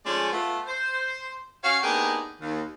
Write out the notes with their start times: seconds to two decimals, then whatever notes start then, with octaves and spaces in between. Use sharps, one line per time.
0.06 F3 G#3 A3 C#4 A4 D5
0.32 A3 B3 F4
0.67 C5
1.64 C#4 F#4 C#5 F5
1.83 A#3 B3 D4 D#4 G4 G#4
2.41 D#2